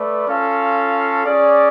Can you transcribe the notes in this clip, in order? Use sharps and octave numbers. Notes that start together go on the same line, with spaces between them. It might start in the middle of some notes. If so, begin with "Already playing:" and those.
Already playing: A3 B4 D5
C#4 F4 A4 F5
C#4 G#4 D5